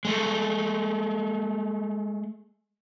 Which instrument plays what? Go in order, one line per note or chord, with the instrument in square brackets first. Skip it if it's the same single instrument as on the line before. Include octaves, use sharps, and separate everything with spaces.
[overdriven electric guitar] G#3 A3